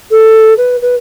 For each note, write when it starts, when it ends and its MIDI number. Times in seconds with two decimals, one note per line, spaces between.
0.11 0.53 69
0.57 0.76 71
0.81 0.95 71